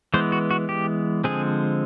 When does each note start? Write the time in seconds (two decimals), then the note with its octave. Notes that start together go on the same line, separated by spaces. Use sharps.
0.14 E3 G#3 B3 C5
0.32 F#4
0.51 F#4
0.69 G4
1.24 D3 F3 G#3 C4 G#4